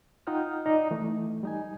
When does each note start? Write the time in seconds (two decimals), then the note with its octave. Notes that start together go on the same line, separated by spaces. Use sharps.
0.27 D#4 F4 D#5 F#5 G5 F6
0.66 D#4 D5
0.91 E3 A3
1.43 G3 D#4 G#5